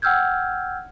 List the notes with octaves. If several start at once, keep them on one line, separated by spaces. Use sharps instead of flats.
F#5 G5 E6 F6 G6 G#6